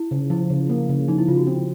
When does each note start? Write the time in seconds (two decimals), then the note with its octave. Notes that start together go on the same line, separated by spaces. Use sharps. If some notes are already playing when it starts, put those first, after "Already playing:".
Already playing: E4
0.11 C#3
0.30 F3 E4
0.50 C#3
0.69 A#3
0.89 C#3
1.08 F3 D#4
1.19 E4
1.28 C#3 F4
1.37 F#4
1.47 C4